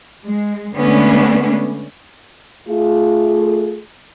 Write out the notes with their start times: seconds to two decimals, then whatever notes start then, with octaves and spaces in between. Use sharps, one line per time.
0.25 G#3
0.74 D3 G#3 A3 B3 C#4 D4
2.68 A3 F4 G#4